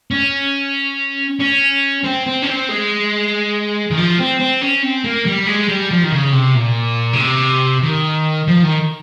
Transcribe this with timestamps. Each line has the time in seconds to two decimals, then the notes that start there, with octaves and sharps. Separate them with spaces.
0.11 C#4
1.40 C#4
2.04 C4
2.26 C4
2.42 C#4
2.48 C4
2.69 G#3
3.91 D#3
3.98 F3
4.19 C4
4.40 C4
4.62 C#4
4.83 C4
5.04 A#3
5.26 G3
5.47 G#3
5.68 G3
5.91 F3
6.03 D#3
6.12 C#3
6.32 C3
6.55 A#2
7.13 C#3
7.19 C3
7.83 D#3
8.48 F3
8.63 D#3